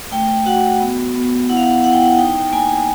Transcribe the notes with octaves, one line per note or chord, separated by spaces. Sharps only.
A3 G5
F#4 F#5
B3
B3
E4 F#5
F5
F#5
E4 F#5
G5
F#5
D#4 G5
A#3 G#5